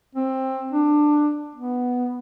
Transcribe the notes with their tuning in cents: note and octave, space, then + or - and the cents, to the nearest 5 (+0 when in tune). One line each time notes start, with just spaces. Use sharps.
C4 +15
D4 +15
B3 +0